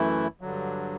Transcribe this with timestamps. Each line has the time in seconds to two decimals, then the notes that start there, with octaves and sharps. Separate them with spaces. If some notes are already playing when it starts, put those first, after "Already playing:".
Already playing: F#2 E3 A3 E4
0.41 G2 D3 F#3